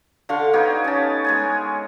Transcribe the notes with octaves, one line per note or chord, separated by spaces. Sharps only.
D3 F5 C6 C#6
B3 D#4 G4 C#5
C#4 A5
G#3 C#5 G#5